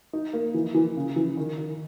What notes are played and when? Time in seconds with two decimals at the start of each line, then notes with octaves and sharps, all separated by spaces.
0.13 D#4
0.33 A#3
0.54 E3
0.74 E3
0.96 C#3
1.16 E3
1.37 D#3
1.58 D#3